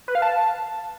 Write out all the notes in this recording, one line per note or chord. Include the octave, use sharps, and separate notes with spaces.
B4
F5
A5